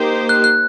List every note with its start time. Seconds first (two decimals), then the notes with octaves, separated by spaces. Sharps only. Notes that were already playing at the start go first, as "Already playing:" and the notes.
Already playing: A#3 D#4 G4 C5
0.29 F#6
0.44 F#6